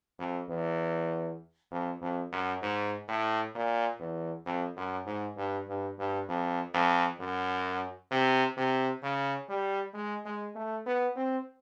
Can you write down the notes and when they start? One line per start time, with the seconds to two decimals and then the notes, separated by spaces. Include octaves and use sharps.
0.19 F2
0.48 E2
1.71 F2
2.01 F2
2.32 F#2
2.62 G#2
3.08 A2
3.55 A#2
3.99 E2
4.46 F2
4.76 F#2
5.06 G#2
5.37 G2
5.67 G2
5.98 G2
6.28 F2
6.74 F2
7.20 F#2
8.11 C3
8.57 C3
9.02 C#3
9.49 G3
9.94 G#3
10.25 G#3
10.55 A3
10.86 B3
11.16 C4